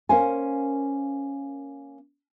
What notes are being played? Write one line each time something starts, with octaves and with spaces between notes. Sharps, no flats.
A#3 C#4 A#4 C5 F5 G#5